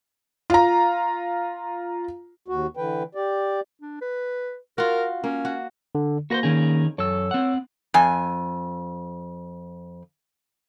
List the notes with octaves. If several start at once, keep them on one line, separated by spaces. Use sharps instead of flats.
F4 A#5
D#2 F#4
D3 E3 B4 G5
G4 D5
D4
B4
F4 F#4 A#4
A#3 C#4
F#4
D3
A#3 F#4 B4 C5 A#6
D#3 C#4 G#4
F#2 A4 C#5 E6
C4 F#5
F2 G#5